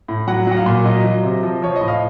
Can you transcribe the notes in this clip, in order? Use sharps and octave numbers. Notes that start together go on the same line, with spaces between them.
A2
F#3 F#5
F#3 F#5
F5
A#2
F#3 D#5
F#3
C3
F3
F3 C#5
D#5
A2
F5